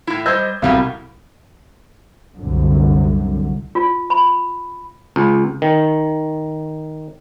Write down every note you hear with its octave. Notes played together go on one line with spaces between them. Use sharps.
A2 E4
G3 C5 D#5 E6 G6 G#6
C2 B2 F#3 G3 A3 F5
C2 F#2 D3
F4
B5
C#2
D#3